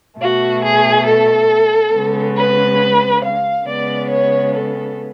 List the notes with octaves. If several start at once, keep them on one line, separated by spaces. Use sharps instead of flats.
B2 A3 F#4
G#4
A4
C#3 G#3 B3
B4
F5
C#3 G#3 B3 D5
C#5
A4